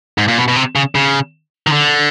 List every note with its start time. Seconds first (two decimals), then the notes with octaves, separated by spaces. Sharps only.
0.18 G#2
0.28 A#2
0.38 B2
0.48 B2
0.56 C3
0.75 C#3
0.95 C#3
1.67 D#3
1.72 D3